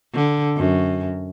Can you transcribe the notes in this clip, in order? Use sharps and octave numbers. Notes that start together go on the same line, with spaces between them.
D3
F#2